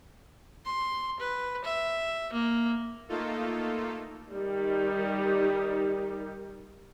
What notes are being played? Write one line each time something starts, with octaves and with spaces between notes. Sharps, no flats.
C6
B4
E5
A#3
A3 A#3 D#4 F4 A4
D#3 G3 D#4 G4